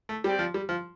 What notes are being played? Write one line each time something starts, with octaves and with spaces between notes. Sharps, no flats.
A3
G3 C4 G4 D5 G5
F3
G3
F3